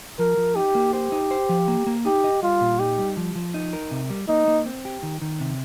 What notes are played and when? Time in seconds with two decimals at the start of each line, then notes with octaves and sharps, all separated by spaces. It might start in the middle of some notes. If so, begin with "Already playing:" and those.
0.19 F3 A#4
0.37 F3
0.56 D#4 G4
0.75 A#3
0.93 G4 C5
1.12 D#4
1.31 C5
1.49 F3
1.68 A#3
1.87 A#3
2.05 D#4 G4
2.24 D#5
2.42 G3 F4
2.61 A#2
2.79 D#4 G4
2.98 G3
3.17 F3
3.35 F3
3.54 D#4
3.73 A#4
3.91 C3
4.10 G3
4.28 A#3 D#4
4.48 A#3
4.66 C4
4.85 G4
5.03 D#3
5.21 D#3
5.40 C3